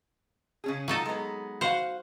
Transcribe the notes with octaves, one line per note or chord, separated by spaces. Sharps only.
C#3 C#4 G#4
F#3 D#4 F4 A4
G#3 B3
F#4 C5 F5 F#5